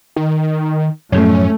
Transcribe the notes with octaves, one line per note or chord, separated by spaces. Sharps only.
D#3
F#2 A2 F3 A3 C#4